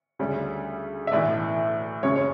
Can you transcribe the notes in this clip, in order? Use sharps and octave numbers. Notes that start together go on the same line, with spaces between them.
D2 C#3 G3 C#4
E5
B1 A2 E3 D5
F#1 F#2 C#3 C#5
C#5